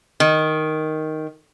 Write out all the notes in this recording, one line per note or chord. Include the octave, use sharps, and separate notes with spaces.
D#3